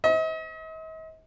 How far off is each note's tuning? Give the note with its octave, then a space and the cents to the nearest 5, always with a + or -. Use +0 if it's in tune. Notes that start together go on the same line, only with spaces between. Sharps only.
C5 +0 D#5 +45